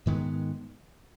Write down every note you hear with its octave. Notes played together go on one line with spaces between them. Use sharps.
G#2 D#3 G#3 B3